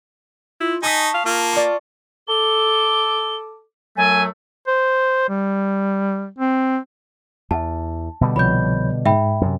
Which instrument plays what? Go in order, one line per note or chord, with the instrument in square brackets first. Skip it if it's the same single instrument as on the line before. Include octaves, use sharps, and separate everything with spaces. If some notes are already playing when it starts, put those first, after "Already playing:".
[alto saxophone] E4 [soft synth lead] F4
[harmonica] D#4 [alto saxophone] G#5 [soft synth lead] A5 [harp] C#6 D#6 B6
[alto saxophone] F5
[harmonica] A#3 [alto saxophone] F4
[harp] D5 C#6
[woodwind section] A4 D6 [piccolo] G7
[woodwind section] F#2 F#3 A3 [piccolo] G#5
[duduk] C5
G3
C4
[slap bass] E2 [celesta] A5
[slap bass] B2 D3 G3
[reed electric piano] C2 F3 C#5 [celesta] B5 G6
[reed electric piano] G#2 [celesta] E5 G5 B5
[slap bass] F#2 C3